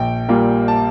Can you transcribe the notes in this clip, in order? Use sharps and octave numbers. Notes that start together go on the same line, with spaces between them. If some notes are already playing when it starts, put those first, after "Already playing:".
Already playing: A#1 G5
A#2 G3 A#3
A5